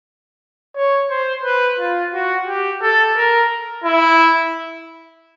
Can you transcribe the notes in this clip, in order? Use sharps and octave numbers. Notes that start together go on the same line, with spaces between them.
C#5
C5
B4
F4
F#4
G4
A4
A#4
E4